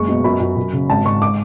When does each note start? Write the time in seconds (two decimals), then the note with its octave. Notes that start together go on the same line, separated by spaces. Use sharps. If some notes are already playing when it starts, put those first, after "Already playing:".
Already playing: F#1 G#3 C#6
0.08 B2
0.24 F#2 B5
0.40 F#2
0.57 F#2
0.73 C#3
0.89 G#1 A5
1.05 G#2 C#6
1.22 D6